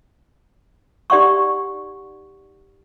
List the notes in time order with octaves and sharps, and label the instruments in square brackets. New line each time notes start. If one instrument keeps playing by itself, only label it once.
[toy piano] D#4 G4 D5 F#5 C6 C#6